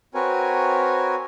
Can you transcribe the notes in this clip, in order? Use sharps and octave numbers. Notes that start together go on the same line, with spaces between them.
C4 F#4 A#4 B4 C#5 G#5